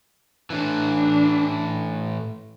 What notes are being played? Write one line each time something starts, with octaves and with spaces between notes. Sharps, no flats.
A2 E3 D4